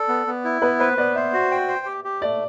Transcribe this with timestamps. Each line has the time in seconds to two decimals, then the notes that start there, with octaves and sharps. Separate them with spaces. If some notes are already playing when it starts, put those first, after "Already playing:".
Already playing: A4 D5
0.09 B3
0.27 B3
0.45 E4
0.62 B3 B4
0.80 B4 C5
0.98 B3 D5
1.15 C5 E5
1.33 F#4
1.51 G5
1.68 C5
1.86 G4
2.04 G4
2.21 A3 D5